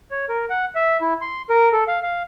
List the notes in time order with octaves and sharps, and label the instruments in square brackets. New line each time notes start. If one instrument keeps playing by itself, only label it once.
[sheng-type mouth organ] C#5
A#4
F#5
E5
E4
C6
A#4
A4
F5
F5